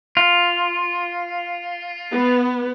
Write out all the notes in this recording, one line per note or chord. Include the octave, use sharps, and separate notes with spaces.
F4
B3